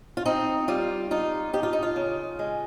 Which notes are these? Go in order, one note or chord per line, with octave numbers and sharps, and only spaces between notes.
F4
C4 D#4
G3 F4
D#4 F4
D#4 G4
F4
D#4
F4
C#3
G#3